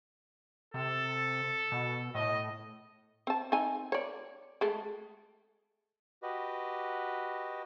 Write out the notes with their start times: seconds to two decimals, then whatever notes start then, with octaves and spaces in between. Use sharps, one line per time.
0.74 C3 A4
1.72 B2
2.15 A2 D#5
3.27 C4 A5
3.52 C4 D#4 G#5
3.92 C#5 D5
4.61 G#3 A3
6.23 F#4 G4 B4 D#5